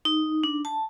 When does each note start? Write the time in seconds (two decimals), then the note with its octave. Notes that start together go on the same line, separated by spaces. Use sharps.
0.05 D#4
0.44 D4
0.65 A5